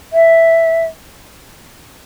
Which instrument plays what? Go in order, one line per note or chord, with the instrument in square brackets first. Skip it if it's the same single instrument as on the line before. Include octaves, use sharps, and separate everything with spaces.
[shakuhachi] E5